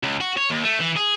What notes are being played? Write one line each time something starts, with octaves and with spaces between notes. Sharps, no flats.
C#2
F#4
C#5
D#2
A3
E3
G#4